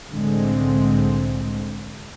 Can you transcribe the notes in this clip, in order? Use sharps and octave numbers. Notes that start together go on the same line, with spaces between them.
C2 A2 D3 G#3 C4